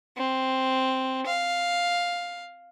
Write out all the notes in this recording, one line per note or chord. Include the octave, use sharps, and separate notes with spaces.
C4
F5